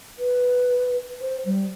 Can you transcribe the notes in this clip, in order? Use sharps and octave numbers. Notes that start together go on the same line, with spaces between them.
B4
C5
G3